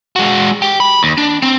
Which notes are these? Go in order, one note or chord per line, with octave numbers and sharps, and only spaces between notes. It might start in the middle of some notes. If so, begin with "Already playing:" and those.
G#3 F#4
G4
B5
D#2
D4
C4